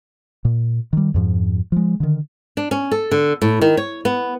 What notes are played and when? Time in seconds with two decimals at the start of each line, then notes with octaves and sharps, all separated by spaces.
0.45 A#2
0.93 D#3 G3
1.14 F2 G#2 F3
1.72 F3 G#3
2.00 D3 D#3
2.57 D4
2.71 C#4
2.92 A4
3.11 D3
3.42 A2
3.61 D#3
3.77 C#5
4.05 B3